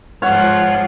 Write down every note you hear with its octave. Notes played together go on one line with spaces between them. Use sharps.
G#2 F3 C#5 F#5